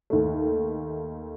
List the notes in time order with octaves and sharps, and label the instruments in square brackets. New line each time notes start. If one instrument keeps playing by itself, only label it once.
[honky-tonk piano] D#2 A3